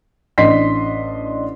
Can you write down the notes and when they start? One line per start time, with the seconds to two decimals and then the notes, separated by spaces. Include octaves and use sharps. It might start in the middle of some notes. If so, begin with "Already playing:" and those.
0.38 A1 D4 D#5 C6 B6 C7